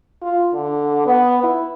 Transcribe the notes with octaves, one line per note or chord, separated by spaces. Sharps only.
F4
D3
B3
E4